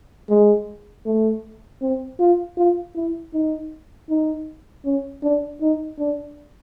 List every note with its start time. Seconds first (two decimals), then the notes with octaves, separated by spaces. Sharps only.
0.30 G#3
1.06 A3
1.82 C4
2.19 F4
2.57 F4
2.95 E4
3.33 D#4
4.09 D#4
4.85 C#4
5.23 D4
5.61 D#4
5.99 D4